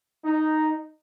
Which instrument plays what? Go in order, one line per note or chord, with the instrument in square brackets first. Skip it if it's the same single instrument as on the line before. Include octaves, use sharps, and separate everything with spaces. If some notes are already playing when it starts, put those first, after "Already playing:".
[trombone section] D#4